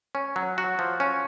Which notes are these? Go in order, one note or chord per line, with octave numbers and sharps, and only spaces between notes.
C#4
F#3
F#4
F3
C#4